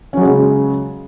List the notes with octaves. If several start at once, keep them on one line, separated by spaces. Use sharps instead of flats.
C#3 F#3 G#3 C#4